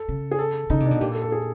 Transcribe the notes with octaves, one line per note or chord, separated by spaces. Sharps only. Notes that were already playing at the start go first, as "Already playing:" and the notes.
Already playing: A4
C#3
G#4
A4
C#3 D#4
C3
D4
B2
A#2 G4
A4
A4
G#4